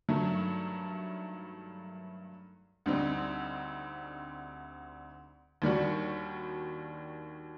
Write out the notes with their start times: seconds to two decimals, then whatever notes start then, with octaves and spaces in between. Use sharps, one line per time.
0.09 G2 D#3 F#3 A3
2.86 D2 D3 G3 C4 D#4
5.62 D#2 D#3 G3 D4 F#4